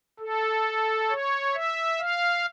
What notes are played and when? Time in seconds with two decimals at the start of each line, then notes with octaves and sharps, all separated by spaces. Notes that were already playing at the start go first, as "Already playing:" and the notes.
0.19 A4
1.09 C#5
1.54 E5
1.99 F5